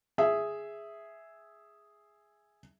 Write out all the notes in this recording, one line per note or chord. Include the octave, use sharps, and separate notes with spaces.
G#4 E5